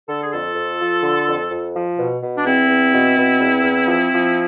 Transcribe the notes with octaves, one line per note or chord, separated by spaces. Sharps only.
D3 A4
G#4
F2 F4 A4
F2
F3
D3
F2
F2
F3
B2
B2
D4
E2 C4 E4
E2
B2
B2
E2
E2
F3
F3